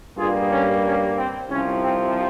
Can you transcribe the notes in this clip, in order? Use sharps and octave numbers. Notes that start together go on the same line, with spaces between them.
G2 G3 A#3 F4 G#4
C#4
C#4
C4
C2 C3 F3 C#4
C4